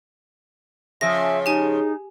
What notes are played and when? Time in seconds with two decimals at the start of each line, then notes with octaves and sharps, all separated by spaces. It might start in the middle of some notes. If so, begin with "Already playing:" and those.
1.01 C#3 F3 G#4 E5 A#6
1.46 D#4 G4 G#5